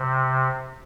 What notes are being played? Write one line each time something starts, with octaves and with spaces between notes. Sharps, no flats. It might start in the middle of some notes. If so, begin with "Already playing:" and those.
Already playing: C3